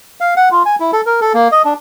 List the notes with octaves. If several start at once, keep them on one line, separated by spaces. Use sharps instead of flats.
F5
F#5
F4
G#5
E4
A4
A#4
A4
A#3
D#5
D4